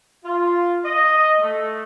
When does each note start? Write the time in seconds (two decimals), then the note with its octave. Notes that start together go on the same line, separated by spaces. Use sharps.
0.24 F4
0.84 D#5
1.41 A3